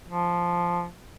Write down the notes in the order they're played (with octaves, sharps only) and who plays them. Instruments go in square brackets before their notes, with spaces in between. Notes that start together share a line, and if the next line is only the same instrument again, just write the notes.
[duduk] F3